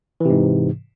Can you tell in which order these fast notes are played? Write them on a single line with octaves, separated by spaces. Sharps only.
E3 C3 G#2